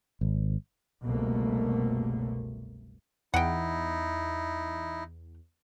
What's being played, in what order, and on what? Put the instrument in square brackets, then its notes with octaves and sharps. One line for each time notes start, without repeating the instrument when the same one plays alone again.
[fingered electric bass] G#1
[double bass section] F#1 C2 B2 A3 A#3
[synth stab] E2 [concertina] D#4 E4 [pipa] F#5 G5